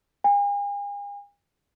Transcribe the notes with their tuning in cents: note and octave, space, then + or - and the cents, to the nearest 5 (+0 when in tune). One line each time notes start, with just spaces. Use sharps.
G#5 -45